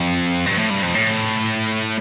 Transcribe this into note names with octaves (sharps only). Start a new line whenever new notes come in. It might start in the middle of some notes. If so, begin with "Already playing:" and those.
Already playing: F2
G2
A2
G2
F2
A2